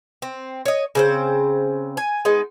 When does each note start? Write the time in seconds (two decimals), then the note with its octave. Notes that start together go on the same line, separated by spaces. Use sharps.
0.22 C4
0.65 C#5 D#5
0.95 C#3 C4 C5
1.97 G#5
2.25 G#3 B3 D#4